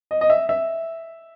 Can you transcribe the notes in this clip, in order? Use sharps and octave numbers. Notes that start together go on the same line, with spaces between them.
D#5
D#5
E5
E5